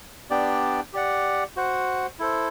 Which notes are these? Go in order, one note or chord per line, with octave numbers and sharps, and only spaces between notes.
B3 D4 G4 D5 G5
G4 D5 F#5
F#4 C5 F#5
E4 A4 C5